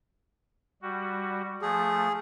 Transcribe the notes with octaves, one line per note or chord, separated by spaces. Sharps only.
G3 F#4
F3 A3 G#4